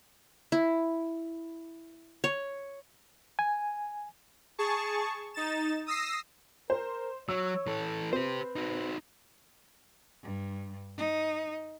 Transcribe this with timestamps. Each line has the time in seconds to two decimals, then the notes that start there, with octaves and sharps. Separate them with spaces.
0.52 E4
2.24 C#5
3.39 G#5
4.58 G#4 A5 C#6
5.34 D#4 A6 E7
5.86 D#6 E6 A#6 C7
6.70 A#4 C5
7.29 F#3 C#5 E6
7.67 E3 A4
8.13 C4 G4 B4 C5
8.56 D#4 F#4
10.23 G2
10.97 D#4